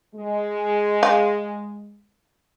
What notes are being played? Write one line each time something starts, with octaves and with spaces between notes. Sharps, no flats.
G#3
F4